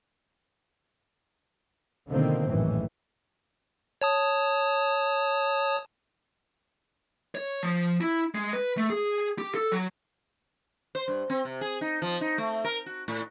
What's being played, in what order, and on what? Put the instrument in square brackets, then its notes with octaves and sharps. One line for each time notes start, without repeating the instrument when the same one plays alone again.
[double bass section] B2 D3 D#3 F3 A#3 C4
A#1 F#2 A2 D#3 E3
[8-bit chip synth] C#5 A5 D#6
[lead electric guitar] C#5
F3
E4
G#3
B4
A3
G#4
G4
A4
F#3
[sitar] C5
G2
C4
C3
G#4
D#4
F3
D#4
A3
A#4
F#4
A2